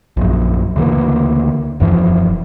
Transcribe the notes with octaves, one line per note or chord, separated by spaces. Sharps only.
A#1 F#2
D2 C#3 E3 A#3
E1 F#2 E3 F3